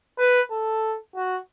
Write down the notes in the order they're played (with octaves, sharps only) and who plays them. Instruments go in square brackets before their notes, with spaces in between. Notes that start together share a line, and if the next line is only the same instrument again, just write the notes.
[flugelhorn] B4
A4
F#4